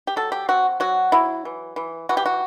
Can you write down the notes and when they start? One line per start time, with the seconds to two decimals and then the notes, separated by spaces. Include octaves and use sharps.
0.07 G4
0.16 F#3 A4
0.32 G4
0.49 C4 F#4
0.80 F#3 F#4
1.12 F#3 E4
1.45 E3
1.76 E3
2.09 E3 F#4
2.17 G4
2.26 F#4